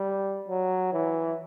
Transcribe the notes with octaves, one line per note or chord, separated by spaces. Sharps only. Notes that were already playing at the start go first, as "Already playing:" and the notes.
Already playing: G3
F#3
E3